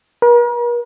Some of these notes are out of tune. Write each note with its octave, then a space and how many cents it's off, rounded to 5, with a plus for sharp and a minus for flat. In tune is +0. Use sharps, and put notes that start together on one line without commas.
A#4 +45